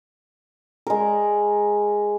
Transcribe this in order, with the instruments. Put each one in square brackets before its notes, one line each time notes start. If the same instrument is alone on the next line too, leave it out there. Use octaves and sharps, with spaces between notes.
[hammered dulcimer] G#3 A#4